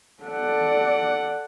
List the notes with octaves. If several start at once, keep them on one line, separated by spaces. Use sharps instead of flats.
A4 D5 F#5